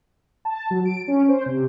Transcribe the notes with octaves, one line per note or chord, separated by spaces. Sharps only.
A5
F#3
D7
C#4
C5
C3